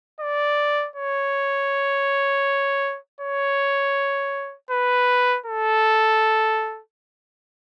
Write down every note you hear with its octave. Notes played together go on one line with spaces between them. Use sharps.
D5
C#5
C#5
B4
A4